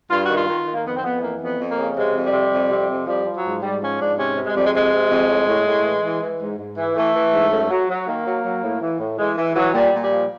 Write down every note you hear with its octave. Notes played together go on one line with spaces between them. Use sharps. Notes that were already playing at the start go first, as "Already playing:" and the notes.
G2 F4
F#4
D#3 F4
D#3
D#3
A#3
F2 B3
C4
F2 B3
E3 A#3
F2 B3
F2
A#3
C#3
C3 G#3
F2
G3
C3
F2
C3
F2
F3 G3
F3
F#3
G#2
G#2 G3
F3 C#4
G#2 D4
C3 C#4
C3
G#3
F2 G3
G#3
C3 G#3
C3
F2
A2
A2
A2
E3
E3
E3
G#2
G#2
E3
E3 A3
E3
G#2
F#2
F#3
F#3
D#3 A#3
F#3
F#3
A2
E3
A2
E3 G#3
E3
E3 F#3
A#2 G3
A#2
G3
F3